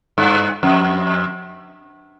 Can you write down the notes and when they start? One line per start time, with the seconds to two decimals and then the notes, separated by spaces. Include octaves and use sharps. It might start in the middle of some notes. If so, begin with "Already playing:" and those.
0.18 G2
0.63 F2